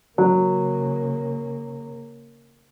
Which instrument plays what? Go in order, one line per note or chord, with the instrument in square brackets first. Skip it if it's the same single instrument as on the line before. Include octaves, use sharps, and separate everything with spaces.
[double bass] C#3 A#3 [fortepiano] F#3